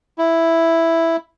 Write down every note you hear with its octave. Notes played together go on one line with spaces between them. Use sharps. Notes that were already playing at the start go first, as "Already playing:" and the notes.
E4